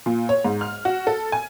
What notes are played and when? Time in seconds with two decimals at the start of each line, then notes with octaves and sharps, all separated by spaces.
0.06 A#2
0.29 C#5
0.45 G#2
0.61 F6
0.85 F#4
1.07 A4
1.32 G#5